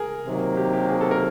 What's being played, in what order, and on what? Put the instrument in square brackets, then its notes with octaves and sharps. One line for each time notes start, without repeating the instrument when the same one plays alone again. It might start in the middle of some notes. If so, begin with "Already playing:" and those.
Already playing: [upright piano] G#4 A#4
[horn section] C3 D#3 F#3 A#3
[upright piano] G4
G4
G#4
A4
A#4